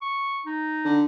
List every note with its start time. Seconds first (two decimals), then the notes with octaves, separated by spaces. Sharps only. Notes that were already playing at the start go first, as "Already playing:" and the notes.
0.02 C#6
0.46 D#4
0.85 D3